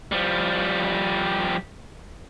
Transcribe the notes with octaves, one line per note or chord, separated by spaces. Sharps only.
F3 G3